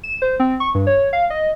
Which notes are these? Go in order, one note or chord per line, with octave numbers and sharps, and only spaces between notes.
E7
C5
C4
C#6
G2
C#5
F5
D#5